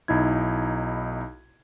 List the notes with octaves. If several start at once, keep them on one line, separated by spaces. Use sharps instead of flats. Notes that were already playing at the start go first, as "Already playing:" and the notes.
B1 D#4 E4 G#6